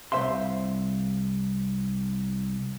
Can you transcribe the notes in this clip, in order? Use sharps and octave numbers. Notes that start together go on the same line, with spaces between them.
C2 B2 C5 E5 F5 C6